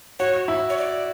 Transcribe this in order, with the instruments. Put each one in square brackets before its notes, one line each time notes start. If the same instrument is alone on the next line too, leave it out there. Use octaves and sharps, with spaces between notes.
[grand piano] F#4 [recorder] C#5
[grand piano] E4
[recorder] C#5
D5